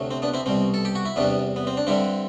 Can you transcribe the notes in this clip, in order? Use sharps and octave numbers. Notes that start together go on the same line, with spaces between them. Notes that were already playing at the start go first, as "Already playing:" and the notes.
Already playing: D2 C3 F#3 A3
C4
B3 D4
C4 E4
C2 B2 G3 C4
A4
G4
F#4
E4
E2 C3 G3 B3 D4
B3
C4
D4
G2 D3 G3 C4 E4